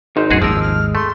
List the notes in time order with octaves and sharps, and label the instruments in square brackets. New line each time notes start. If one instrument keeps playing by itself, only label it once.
[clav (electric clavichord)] G#1 [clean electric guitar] D#4 C5
[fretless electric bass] A1 F#2 [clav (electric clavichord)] F#4 G#4
[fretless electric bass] G#1 D#2 [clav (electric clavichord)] F3 A#4 [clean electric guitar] G#3 [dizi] E6
[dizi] F6
[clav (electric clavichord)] A3 [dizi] C6